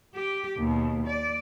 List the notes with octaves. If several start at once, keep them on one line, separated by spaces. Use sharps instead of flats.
G4
D#2 B2
D5